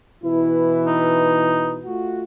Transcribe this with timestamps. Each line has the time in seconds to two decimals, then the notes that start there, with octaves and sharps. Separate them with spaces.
0.23 B2 E3 E4 B4
0.86 D#4
1.84 A3 F4 F#4